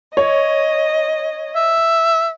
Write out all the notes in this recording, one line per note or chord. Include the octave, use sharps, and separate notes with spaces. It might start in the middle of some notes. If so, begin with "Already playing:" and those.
C#5 D#5
E5